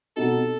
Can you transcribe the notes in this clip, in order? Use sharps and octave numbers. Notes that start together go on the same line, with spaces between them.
B2 G3 C4 D#4 F#4 A4